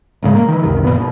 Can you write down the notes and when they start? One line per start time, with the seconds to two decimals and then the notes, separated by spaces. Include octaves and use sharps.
0.23 A1 G#2 C#3 G#3
0.35 A#3
0.48 D#3 E3
0.63 C#2 F#2 C3 D#3
0.83 A#1 F#2 A#2 B3
0.96 F#1 B2